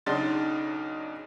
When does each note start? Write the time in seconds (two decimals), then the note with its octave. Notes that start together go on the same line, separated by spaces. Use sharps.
0.06 B1 C#3 D4 D#4 C6 A6